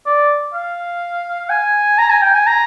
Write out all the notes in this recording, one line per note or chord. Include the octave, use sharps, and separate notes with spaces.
D5
F5
G#5
A#5
G#5
G5
G#5
A#5